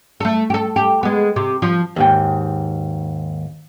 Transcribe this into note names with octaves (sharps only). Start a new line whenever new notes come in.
A3 A4
G4 A4
G4
G#3 B3
C3
F3
D#2 G#2 G5